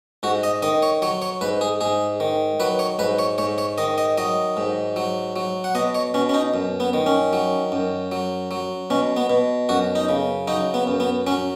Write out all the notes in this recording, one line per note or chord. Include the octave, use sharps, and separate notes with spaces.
G#2 F#4
D#5
D#3 D#5
C#5
F#3 C#5
C#5
G#2 B4
G#4
G#2 G#4
D#3
F#3 B4
C#5
G#2 B4
C#5
G#2 C#5
C#5
D#3 D#5
D#5
F#3 D#5
G#2
F#3
F#3
F#5
B2 D#5
C#5
B2 C#4
C#4
D#4
F#2
B3
D#3
C#4
F#3
F#2
F#3
F#3
B2 C#4
B3
B2
F#2 F#4
D#4
C#3
F#3 D#4
B3
F#2
B3
F#3 C#4